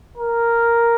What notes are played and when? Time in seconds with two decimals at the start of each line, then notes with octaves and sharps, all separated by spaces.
0.17 A#4